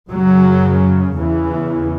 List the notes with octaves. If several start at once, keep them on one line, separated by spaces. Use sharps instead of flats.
F#2 C#3 F#3
E2 C#3 E3